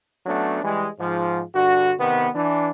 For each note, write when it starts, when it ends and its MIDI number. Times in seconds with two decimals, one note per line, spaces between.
0.26 0.62 54
0.26 0.62 57
0.26 0.62 59
0.26 0.62 61
0.26 0.62 62
0.63 0.88 52
0.63 0.88 55
0.63 0.88 56
0.99 1.42 44
0.99 1.42 53
1.54 1.93 43
1.54 1.93 50
1.54 1.93 66
1.99 2.28 48
1.99 2.28 51
1.99 2.28 59
2.35 2.70 52
2.35 2.70 62